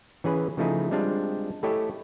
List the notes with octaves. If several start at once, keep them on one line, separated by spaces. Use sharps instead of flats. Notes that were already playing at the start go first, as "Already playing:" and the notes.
E3 C#4 G#4 B4
C#3 F3 A3 D#4 E4 G#4
G3 G#3 C4 D4 F4 F5
A3 E4 G4 A4 C#5 D#5